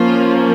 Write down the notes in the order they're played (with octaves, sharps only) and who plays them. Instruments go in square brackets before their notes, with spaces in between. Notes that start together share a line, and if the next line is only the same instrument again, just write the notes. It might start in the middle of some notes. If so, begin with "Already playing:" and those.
Already playing: [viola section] F3 A#3 C#4 F4